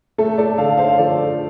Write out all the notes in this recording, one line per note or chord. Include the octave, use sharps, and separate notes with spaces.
A3 A4
A4 D5
D3 F5 A5
C5 F5
F3 A4 D5